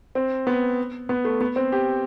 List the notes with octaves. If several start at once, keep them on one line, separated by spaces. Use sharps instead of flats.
C4
B3
B3
A3
B3
C4
G4